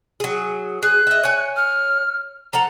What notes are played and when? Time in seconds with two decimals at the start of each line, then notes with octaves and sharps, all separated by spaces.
0.20 F#3 G#4
0.83 G#4 F#6
1.07 D#5 E5
1.24 C#5 G#5
1.56 F6
2.53 F3 A4 F#5 A#5